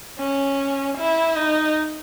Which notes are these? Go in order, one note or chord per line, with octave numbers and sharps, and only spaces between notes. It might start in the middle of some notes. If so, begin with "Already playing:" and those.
C#4
E4
D#4